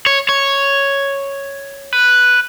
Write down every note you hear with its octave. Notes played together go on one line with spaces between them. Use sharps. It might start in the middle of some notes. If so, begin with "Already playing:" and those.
C#5
C#5
B4